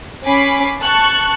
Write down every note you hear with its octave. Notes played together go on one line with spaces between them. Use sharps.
C#4 G#5 B5 D6 B6 C7
A5 C#6 F#6